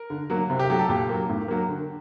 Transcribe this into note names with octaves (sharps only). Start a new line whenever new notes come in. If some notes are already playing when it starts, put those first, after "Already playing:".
Already playing: A#4
D3
F#3 A#3
C3
G4
F#3 A3 G4
A4
A#2 G4
F#3 A#3
A2
F#3 A#3
D3